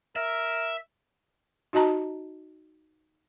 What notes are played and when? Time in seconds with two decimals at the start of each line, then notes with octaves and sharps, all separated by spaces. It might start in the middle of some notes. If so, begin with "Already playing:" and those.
0.16 A#4 E5
1.73 D#4 F#4 D#5 A5 A#5